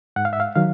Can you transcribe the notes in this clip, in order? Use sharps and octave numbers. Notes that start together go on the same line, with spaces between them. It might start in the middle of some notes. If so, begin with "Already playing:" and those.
G#2 F#5
F5
E5
F5
D#3 F#3 F5